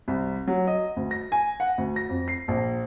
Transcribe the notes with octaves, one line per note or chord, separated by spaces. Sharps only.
C2
F#3
D#5
D2
A#6
G#5
F#5
D2
A#6
F2
C7
A#1